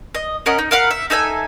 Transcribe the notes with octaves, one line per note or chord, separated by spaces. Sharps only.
D#5
C#4 A#4 D#5 F#5
D#4
A#4 F5 F#5 B5
E5
D#4 A4 E5 G#5